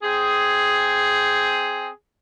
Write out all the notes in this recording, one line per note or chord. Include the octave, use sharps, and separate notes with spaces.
C4 G#4